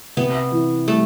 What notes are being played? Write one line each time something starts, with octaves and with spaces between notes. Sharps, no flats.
C3 B3
E3
G3 A3